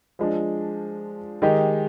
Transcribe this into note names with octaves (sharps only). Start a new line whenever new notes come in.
F3 G#3 D4
D#3 G#3 D#4 G4